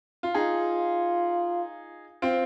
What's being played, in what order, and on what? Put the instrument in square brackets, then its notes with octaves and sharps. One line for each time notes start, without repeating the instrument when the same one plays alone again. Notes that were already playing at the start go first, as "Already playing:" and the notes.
[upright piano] F4
[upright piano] D#4 G#4 [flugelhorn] F4
[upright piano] C4 F4